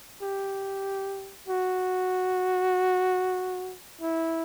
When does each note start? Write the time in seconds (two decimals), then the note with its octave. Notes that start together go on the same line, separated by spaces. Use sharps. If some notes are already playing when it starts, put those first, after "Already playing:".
0.22 G4
1.48 F#4
4.01 E4